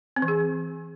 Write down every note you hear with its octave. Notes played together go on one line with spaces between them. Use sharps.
C4
E3
G#4